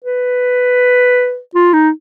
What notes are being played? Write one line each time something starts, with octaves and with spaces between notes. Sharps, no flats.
B4
F4
D#4